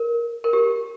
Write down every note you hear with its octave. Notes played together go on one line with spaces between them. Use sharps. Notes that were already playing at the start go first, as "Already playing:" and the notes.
Already playing: A#4
A#4
G4